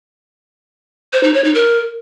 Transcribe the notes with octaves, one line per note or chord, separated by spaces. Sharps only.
C5
D#4
C#5
D#4
A#4